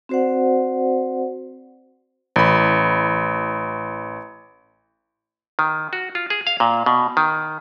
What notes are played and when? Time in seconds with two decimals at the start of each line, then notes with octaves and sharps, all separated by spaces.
0.09 C4 F#4 C5 D5 F#5
2.36 A1 B5
5.59 D#3
5.93 F#4
6.15 F4
6.30 G#4
6.47 F5
6.60 A#2
6.86 B2
7.17 D#3